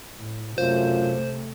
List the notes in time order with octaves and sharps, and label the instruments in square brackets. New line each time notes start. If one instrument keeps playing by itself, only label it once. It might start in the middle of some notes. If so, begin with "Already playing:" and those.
[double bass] A2
[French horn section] F#2 F4 [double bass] C3 A3 [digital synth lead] C5